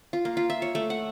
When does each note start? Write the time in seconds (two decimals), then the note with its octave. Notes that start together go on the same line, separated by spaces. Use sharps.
0.13 F4
0.25 A#3
0.37 F4
0.50 E5
0.62 C#5
0.75 A3
0.90 F#5